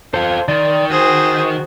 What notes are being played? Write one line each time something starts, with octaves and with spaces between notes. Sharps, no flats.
F4 A4 C5
D#3 D5 C6
F#4 G#4 C5